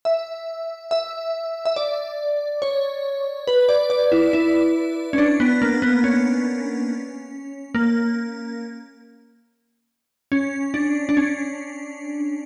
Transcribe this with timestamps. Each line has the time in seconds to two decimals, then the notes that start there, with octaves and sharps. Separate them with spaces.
0.05 E5
0.91 E5
1.65 E5
1.76 D5
2.62 C#5
3.47 B4
3.69 D5
3.90 D5
4.12 E4
4.33 E4
5.13 C#4
5.18 D4
5.40 B3
5.62 A#3
5.82 B3
6.04 C#4
7.75 A#3
10.32 C#4
10.74 D4
11.09 D4
11.17 C#4